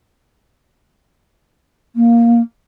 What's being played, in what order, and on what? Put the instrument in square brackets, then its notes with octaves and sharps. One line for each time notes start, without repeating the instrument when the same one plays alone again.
[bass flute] A#3